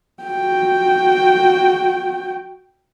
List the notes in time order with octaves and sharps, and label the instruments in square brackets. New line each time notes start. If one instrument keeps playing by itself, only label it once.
[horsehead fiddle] F#4 G5